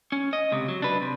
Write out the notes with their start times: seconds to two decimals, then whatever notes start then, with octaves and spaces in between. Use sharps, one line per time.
0.12 C#4
0.33 D#5
0.52 C#2 C3
0.68 F#3
0.82 D4 B4
1.02 C3